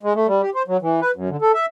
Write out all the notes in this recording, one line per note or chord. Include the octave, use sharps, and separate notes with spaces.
G#3
A3
G3
G4
C5
F#3
E3
B4
F#2
D3
A4
E5